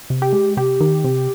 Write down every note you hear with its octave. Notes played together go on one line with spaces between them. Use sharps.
C3
G4
G#3
C3 G4
D#3
C3